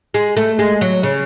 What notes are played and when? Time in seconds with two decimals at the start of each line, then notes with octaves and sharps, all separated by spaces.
0.14 G#3
0.37 A3
0.59 G#3
0.81 F#3
1.03 C#3